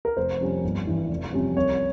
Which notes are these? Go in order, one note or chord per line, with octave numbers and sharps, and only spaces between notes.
A#4
F1 C5
F2 C3 G3 C#4
G1
G2 E3
F1
F2 C3 G3 C#4
C2 C#5